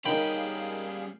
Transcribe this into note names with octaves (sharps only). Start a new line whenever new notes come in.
G3 C#4 D#4 G#4 A#4 F5 G5 B5